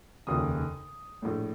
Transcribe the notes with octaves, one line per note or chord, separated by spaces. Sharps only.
F1 D#2 C#3 D#6
A#1 A2